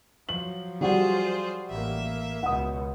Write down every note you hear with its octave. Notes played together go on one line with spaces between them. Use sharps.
F3 F#3 F#7
G3 F4 F#4 G#4 C5
A1 A#3 E5
C#2 B2 F#5 D#6